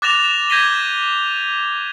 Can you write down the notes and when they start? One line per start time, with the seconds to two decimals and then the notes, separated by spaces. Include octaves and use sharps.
0.02 D6 F#6 A6 A#6 E7 F7
0.50 G6 G#6 A#6 B6 D#7 G7